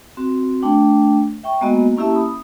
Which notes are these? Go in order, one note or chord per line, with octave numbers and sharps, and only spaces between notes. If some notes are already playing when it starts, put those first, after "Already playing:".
C4 F#4
A3 D4 G5
E5 G5 C#6
G#3 A#3 B3 F#4 D#5
A#3 C#4 E4 G4 E5 A5
B5 D#6